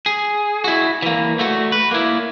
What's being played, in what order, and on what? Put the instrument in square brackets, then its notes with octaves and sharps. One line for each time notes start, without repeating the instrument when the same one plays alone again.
[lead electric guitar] G#4
E4 F#4
E3 A#3
A3 F#4
B4
A#3 E4